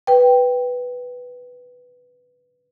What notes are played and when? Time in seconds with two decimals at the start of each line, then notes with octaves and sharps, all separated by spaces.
0.07 B4 G5